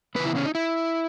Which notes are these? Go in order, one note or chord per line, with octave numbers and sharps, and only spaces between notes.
C#3 E3 B3 B4
E4
C#4
D#4
E4